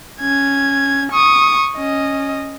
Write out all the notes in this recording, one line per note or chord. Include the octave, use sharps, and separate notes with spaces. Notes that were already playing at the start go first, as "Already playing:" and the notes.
C#4 G#6
C#6 D#6
C#4 D#5